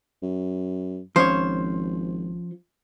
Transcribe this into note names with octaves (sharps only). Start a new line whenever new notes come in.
F#2
G#1 F3 C#4 C5 C#5